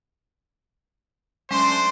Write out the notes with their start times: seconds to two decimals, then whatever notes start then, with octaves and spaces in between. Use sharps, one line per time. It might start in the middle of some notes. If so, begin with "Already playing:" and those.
1.51 F#3 G#3 A3 C#4 D4 C5 C6